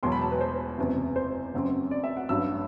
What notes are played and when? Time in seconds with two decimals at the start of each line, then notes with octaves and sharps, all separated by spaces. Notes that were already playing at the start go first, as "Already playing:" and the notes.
0.03 E1 E2 B2 F#3 C6
0.12 B5
0.22 A5
0.32 B4
0.41 C5
0.78 F#1 E2 C3
1.16 C5
1.53 F#1 F#2 F#3 C4
1.91 D5
2.04 E5
2.17 F#5
2.29 A1 G2 F#3 E6